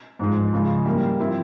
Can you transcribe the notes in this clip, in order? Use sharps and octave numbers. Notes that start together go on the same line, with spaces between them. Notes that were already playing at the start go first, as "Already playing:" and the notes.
G#2 F3 G#3
C#3 F3 G#3
G3 A#3 E4 A#4
F3 C4 E4